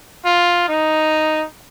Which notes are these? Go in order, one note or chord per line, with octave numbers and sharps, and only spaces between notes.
F4
D#4